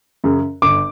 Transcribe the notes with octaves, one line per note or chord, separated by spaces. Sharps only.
F#2 C#3
G1 D6